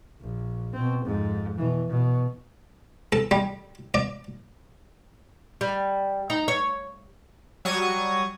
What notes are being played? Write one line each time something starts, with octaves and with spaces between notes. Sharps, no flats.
A#1
B2 C4
F2 G#2
B2 E3
B2
A4
G3
D5
G3
D#4
C#5
F#3 G3 C#6 D#6 G#6